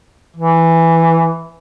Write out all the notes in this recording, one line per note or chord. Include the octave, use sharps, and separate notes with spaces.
E3